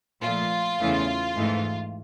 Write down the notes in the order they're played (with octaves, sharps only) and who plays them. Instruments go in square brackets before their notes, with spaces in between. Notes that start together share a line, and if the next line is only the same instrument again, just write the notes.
[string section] A#2 F3 A3 F4
E2 C#3 E3 A3
G#2 E3 A3